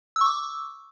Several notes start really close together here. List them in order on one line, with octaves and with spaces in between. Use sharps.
E6 C#6 D6